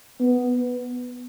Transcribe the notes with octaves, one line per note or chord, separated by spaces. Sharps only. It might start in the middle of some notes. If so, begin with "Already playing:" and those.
B3